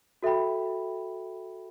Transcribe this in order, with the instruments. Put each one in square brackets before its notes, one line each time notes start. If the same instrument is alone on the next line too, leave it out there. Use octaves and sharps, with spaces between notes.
[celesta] F#4 A4 E5 G5 B5